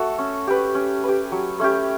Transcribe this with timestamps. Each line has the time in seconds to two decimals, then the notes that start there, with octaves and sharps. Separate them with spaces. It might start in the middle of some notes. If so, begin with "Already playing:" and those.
Already playing: A3 F#4 A4
0.18 C#4
0.47 G4 B4
0.75 C#4
1.04 G4 B4
1.32 F#3
1.59 A3 C#4 G4